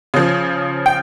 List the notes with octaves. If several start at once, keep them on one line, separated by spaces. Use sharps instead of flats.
C#3 F3
G5